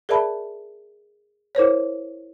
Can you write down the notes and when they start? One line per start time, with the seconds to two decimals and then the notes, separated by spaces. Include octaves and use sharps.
0.09 G#4 A#4 D5 E5 A5 B5
1.55 E4 A#4 C5 C#5